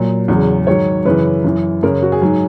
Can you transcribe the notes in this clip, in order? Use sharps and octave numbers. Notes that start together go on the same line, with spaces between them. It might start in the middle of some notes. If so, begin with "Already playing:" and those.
Already playing: A#2 F#3
E2 C#3 F#3
G#2 D#3 F#3 C#5
F#2 C#3 E3 B4
F#2 E3
F#2 C#3 F#3 A#4
F#4
G#4
G#2 F#3